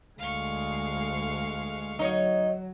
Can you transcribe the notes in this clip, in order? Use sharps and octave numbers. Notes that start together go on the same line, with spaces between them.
D2 G#3 F5 C#6
F#3 D#4 C#5